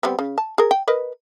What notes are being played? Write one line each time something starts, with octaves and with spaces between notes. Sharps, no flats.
G3 B3 C4
C#3
A5
G#4 A#4
G5
A#4 B4 D#5